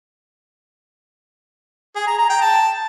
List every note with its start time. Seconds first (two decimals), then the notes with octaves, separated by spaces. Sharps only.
1.96 G#4
2.07 A#5
2.18 A#5
2.30 G5
2.41 A5